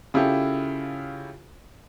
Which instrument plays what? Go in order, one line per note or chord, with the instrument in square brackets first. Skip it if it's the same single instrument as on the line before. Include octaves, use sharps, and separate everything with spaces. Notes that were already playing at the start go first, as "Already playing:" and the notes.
[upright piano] C#3 E4 F4 G4 A4